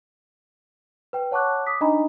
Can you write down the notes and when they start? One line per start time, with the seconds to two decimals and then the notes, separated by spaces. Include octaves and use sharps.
1.13 B4 G5
1.31 C#5 F#5 A5 C#6 D6 F#6
1.67 D6 D#6 B6
1.81 D4 D#4 D#5 G#5 A#5 B5